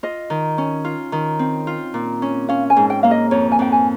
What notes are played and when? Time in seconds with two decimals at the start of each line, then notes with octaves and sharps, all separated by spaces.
0.03 F4 D#5
0.30 D#3
0.58 C#4
0.84 F4
1.12 D#3
1.39 C4
1.67 F4
1.94 A#2
2.22 C#4
2.49 C#4 F5
2.70 G#5
2.77 G#2
2.90 G5
3.03 A#3 F5
3.11 D#5
3.31 F2 C#5
3.52 G#5
3.59 F2 G5
3.72 G#5